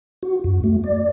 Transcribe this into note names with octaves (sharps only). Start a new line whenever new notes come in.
F#4
F#2
A3
D5